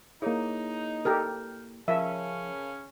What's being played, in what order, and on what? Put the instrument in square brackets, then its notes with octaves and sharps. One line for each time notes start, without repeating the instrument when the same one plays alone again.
[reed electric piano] A#3 E4 [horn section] D#4 [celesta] G#4 C#5
[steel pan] G4 A4 A#4 [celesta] F6 G6
[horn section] C#3 C#4 [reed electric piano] F3 [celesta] A#4 F5 A5 [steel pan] E5